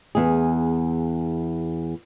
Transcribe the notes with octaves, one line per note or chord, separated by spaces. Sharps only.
E2 G#4